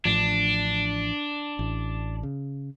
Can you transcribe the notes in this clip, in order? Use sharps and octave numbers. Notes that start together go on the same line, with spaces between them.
A1 A2 F3 D4
A1
C#3